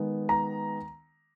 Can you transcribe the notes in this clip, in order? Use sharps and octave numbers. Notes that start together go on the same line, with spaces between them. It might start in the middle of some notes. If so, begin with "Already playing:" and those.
Already playing: D#3 G#3 B3
A#5